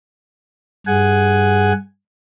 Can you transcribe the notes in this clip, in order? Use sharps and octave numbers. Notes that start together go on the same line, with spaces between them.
G2 G#4 F#5 G#5